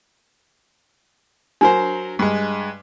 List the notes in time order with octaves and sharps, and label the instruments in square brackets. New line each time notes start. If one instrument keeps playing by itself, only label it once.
[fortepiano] F#3 A#4 C5 [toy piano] D4
[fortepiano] G2 G#3